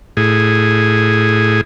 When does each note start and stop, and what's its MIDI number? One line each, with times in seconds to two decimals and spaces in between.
0.17 1.61 45
0.17 1.61 68